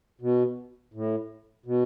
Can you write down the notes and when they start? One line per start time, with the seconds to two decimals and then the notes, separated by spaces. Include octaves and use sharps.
0.21 B2
0.94 A2
1.66 B2